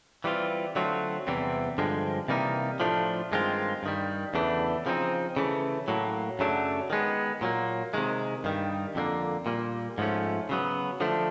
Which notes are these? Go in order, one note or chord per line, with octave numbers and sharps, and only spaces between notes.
E3 G3 C4 F4
D3 F#3 A3 C4 F4
E2 C3 E3 G3 C4
G2 D3 F3 G#3 C4
C3 E3 G3 A#3 D#4
A2 F3 A3 D4 F4
G2 D#3 G#3 C4 F4
G2 D#3 G3
E2 C#3 E3 A3 D4
C#3 F3 A3 C4 D#4
C#3 E3 A3
A2 F#3 A#3
F#2 C#3 F#3 A3 D4
D#3 G#3 B3
A#2 F#3 A#3
C3 D#3 G#3
G2 D#3 G3
F2 D3 G3 A#3
A#2 G3 A#3
G#2 F3 A3 C#4
C#3 F#3 B3
D3 F3 A3 D4